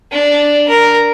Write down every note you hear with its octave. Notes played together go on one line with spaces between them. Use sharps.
D4
A#4